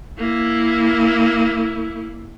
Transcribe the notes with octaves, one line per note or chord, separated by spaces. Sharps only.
A#3 E4